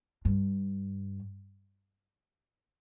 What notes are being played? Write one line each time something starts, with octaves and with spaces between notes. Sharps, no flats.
G2